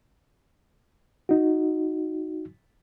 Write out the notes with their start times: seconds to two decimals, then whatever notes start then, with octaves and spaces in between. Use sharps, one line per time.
1.29 D#4 F#4